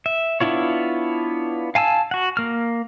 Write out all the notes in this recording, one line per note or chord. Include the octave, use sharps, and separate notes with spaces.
E5
B3 D4 E4 F4 C#5
F5 G#5 A5 E6
F#4 F#5
A#3 F6